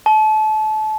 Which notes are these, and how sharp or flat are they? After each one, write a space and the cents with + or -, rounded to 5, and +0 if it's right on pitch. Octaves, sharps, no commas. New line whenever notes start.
A5 -30